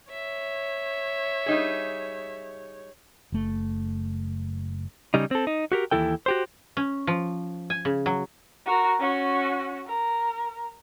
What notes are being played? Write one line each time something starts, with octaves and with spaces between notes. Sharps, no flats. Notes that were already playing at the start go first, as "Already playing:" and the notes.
C#5 E5
G3 D#4 G#4
F#1 A3
C#3 G3 D#4
C4 A4
D#4
F#4 G4 A#4
D#2 G#2 E3 E4 A4 G5
F#4 G4 C5
C#4
F3
G#5
C#3
F#3
F#4 A#4
C#4 F#4
A#4